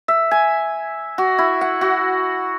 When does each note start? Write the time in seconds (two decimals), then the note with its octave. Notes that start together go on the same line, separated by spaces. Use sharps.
0.08 E5
0.31 G#5
1.18 F#4
1.39 E4
1.61 F#5
1.81 F#4